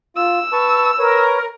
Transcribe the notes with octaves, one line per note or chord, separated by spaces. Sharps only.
F4 E6
B4 A5 C#6
A#4 B4 C#5